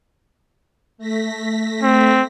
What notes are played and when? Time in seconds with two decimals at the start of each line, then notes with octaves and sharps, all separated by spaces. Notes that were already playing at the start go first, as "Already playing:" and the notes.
0.98 A3 A#6 B6
1.83 C4